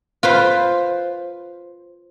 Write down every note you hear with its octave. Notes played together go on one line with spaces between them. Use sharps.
F4 B4 C5